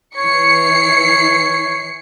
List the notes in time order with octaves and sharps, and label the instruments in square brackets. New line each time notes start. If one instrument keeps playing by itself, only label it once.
[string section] E3 C7 C#7 [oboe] C#5